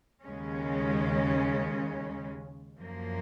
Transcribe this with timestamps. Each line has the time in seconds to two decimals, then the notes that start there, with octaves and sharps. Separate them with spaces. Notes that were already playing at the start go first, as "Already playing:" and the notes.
0.24 D#2 C#3 G#3 C#4
2.78 F#2 F3 A#3